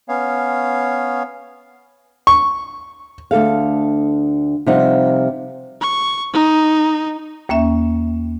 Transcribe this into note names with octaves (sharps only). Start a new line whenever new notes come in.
B3 C#4 C#5 F5
C#6
D2 B2 A4 F5
C3 F3 G3 D#4 F4 F#5
C#6
D#4
D#2 A#3 C#4 E5